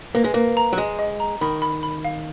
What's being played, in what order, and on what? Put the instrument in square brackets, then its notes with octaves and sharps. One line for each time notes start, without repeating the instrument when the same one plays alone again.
[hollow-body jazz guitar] A#3 [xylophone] B4
[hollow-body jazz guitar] G#3
[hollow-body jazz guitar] A#3 [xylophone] B4
[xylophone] A#5
[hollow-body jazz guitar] F#3
[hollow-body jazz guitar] G#3 [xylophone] D#5
[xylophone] D#5
A#5
[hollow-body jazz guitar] D#3 [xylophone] B5
[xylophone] B5
B5
F5